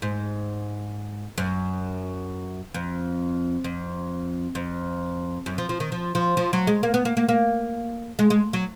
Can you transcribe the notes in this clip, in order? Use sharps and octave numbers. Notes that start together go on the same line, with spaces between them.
G#2
F#2
F2
F2
F2
F#2
F3
F3
D#3
F3
F3
F3
F#3
G#3
A#3
B3
A#3
A#3
A#3
G#3
G#3
F#3